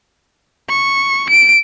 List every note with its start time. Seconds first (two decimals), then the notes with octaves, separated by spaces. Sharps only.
0.69 C#6
1.30 D7